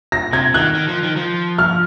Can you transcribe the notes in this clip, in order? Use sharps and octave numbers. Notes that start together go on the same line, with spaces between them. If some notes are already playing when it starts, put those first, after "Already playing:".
A#6
C3 G#6
D#3 F#6
D#3
F3
D#3
F3
F6